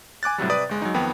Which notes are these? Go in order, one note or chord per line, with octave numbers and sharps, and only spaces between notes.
G#5 D6 F#6 A6
A2 C3 F#3 G3
C3 B4 D5 D#6
G1 G#3
F#3 G#3 D#4
F2 D#3 B3 G5